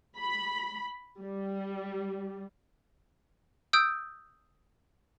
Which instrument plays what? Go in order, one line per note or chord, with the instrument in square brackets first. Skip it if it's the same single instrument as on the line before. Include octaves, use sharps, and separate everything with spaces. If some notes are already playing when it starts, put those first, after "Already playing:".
[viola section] B5
G3
[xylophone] D#6 E6 G6 D7